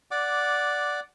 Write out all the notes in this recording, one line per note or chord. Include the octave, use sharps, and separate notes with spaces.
D5 F#5 D6